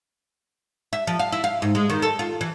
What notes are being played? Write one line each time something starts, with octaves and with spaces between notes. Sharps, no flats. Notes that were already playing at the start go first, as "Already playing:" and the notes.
E5
F3
F5
E4
F5
G#2
G#3
D#3
A4
F4
E3